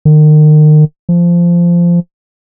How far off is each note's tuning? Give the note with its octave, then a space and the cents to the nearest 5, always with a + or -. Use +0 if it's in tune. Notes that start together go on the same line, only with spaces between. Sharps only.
D#3 -35
F3 -15